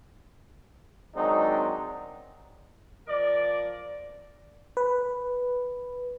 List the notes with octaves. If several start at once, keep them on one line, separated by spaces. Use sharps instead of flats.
D#3 F#3 G#3 C4 D4 D#4
F3 A#4 D5
B4